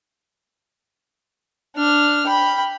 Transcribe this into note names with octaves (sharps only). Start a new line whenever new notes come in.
D4 F6
G5 B5